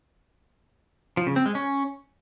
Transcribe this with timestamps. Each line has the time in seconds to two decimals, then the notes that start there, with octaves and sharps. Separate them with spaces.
1.17 F3
1.27 C#3
1.36 C4
1.46 G#3
1.55 C#4